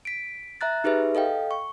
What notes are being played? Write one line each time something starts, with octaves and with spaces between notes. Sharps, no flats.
B6 D7
E5 A#5 F#6 A6
D#4 G4 G#4 B4 E5
A4 D#5 F5 G5
C#6